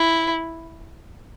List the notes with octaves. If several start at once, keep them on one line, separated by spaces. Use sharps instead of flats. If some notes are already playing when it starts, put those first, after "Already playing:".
Already playing: E4